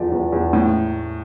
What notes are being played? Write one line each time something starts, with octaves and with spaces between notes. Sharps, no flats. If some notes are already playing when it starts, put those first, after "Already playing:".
Already playing: E2 F3 A3 D5
E2
E2
A2